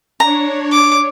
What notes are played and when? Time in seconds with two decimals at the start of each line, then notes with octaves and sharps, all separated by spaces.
0.20 D4 C#5 A#5
0.71 D6